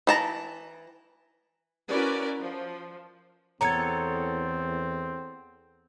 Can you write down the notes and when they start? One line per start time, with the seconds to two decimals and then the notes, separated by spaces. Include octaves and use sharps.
0.07 E3 A5 A#5
1.88 C#4 E4 F#4 A#4 B4 D5
2.40 F3
3.61 E2 B3 C4 A4 C#5 A#5 G#6